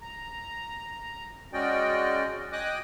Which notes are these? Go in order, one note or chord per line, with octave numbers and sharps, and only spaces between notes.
A#5
G#3 C#4 F#4 D5 D#5 G5
D#5 G5 G#5 D6 D#6 F#6